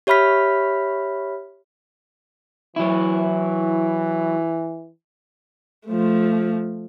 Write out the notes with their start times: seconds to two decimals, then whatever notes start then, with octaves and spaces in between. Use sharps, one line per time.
0.07 G4 C#5 E5 B5 F6 B6
2.76 E3 F#3 E4
5.88 F3 A3